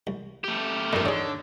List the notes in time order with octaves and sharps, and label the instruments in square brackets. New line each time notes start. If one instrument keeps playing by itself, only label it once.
[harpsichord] C2
[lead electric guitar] A3 G4
[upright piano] G2 [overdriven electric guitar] F3 D#4 [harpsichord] A4 A#4
[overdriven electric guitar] D3 [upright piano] D#4 C#5 [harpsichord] G#4 D5